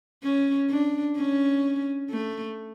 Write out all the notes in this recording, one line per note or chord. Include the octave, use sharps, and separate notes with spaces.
C#4
D4
C#4
A3